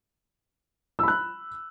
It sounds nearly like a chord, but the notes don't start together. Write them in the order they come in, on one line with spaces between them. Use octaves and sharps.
E6 B5 F#6